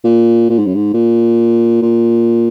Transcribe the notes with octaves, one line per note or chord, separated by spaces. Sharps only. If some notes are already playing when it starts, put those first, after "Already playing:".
A#2
A#2
G#2
F#2
G#2
A#2
A#2